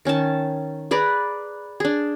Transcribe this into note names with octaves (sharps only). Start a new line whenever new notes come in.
D#3 C#4 D#4 A5
G#4 B4 D5 A#5
D4 G#4